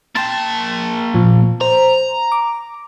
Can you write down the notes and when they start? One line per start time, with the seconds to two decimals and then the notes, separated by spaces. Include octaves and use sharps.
0.15 A#3 G5 A5 C6 A6
1.14 A#2 F3
1.61 C5 A#5
2.32 D6